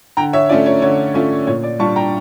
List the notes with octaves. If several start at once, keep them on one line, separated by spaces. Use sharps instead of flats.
D3 G5 A#5
C#5 E5
A3 C#4 F4 D5
C#5
D3 C#5
A3 C#4 F4
A#2 C#5
D5
G3 D4 F4 A5 C#6
G5 A#5